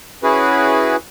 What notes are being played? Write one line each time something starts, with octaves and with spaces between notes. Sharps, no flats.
C#4 E4 F#4 G#4 B4